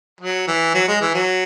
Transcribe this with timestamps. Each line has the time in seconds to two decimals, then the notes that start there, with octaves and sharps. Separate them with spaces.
0.21 F#3
0.47 E3
0.74 F#3
0.88 G#3
1.02 E3
1.14 F#3